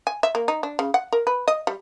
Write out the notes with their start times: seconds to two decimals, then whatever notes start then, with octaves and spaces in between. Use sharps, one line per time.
0.07 G#5
0.23 E5
0.35 A#3
0.48 D#4
0.63 D4
0.79 C#3
0.94 F#5
1.13 A#4
1.27 B4
1.48 D#5
1.67 G3